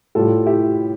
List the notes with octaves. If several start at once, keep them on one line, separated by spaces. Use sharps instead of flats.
A2 G3 F4 A4
E4 G4